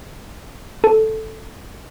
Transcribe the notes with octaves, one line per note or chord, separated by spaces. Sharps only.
A4